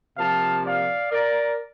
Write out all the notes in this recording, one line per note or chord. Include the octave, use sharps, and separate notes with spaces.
C3 F3 A#3 F5 A5
D5 F5
A#4 D5